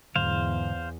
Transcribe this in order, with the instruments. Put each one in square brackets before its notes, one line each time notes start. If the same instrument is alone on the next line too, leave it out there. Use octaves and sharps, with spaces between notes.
[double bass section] E2 [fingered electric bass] G#2 D3 F#3 [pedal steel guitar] C5 F5